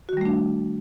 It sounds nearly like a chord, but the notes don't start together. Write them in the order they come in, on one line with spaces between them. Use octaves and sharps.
F#4 D#3 G3 A3 D4